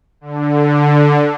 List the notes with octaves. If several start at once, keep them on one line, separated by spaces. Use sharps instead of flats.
D3